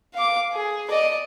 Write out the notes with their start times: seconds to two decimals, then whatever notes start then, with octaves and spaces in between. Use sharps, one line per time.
0.14 F5 D6
0.53 G#4
0.91 D5 D#5